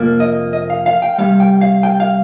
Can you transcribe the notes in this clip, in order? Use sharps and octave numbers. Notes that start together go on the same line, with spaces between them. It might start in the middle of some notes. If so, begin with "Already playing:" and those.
Already playing: F2 C3 F3 A#3
D#5
D#5
F5
F5
G5
C2 A#2 G3 F5
G5
F5
G5
F5